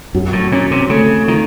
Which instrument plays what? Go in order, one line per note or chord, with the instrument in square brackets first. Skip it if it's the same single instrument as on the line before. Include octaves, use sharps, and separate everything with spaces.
[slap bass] F#2 [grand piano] F#3
[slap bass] A2
[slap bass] A#2 [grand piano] C#4
[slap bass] C3
[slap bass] C#3 [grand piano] A3
[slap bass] D#3 [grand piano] F4